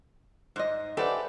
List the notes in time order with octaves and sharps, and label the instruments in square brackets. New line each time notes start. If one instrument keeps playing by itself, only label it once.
[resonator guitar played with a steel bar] G#2 [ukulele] C5 D#5
[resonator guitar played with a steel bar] G4 A4 [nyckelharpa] B4 [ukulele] C5 F#5 [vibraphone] D5 E5 G#5